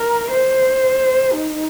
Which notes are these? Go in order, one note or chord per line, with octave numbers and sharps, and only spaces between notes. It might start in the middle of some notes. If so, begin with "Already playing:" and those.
Already playing: A#4
C5
D#4